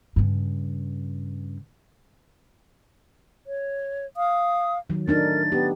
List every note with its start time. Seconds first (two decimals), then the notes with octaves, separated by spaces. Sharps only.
0.16 G2 C#3
3.47 C#5
4.17 F5 D#6
4.90 D#3 F#3
5.08 A3 D4 D#4 A#4 A6
5.52 B3 G4